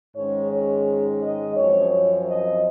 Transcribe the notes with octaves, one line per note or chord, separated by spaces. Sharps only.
G#2 D#3 G#3 C#4 C#5
C#5
D#5
F#2 F3 C4 C#5
C#5
D#5